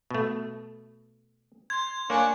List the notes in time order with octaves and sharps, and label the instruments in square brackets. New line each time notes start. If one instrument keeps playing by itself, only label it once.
[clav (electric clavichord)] B2 A3
[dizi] C6 [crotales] G#6
[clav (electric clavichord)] A#3 [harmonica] D4 C#5 [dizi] G#5